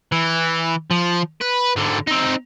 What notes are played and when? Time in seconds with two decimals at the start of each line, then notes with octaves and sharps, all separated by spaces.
0.12 E3
0.91 F3
1.41 B4
1.76 G#2 D3
2.07 C4 D#4